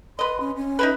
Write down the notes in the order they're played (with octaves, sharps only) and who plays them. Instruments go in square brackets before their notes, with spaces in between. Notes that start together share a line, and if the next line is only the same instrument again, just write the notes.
[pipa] B4 D#5 [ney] C6
[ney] C#4
C#4
[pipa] D#4 E4 B4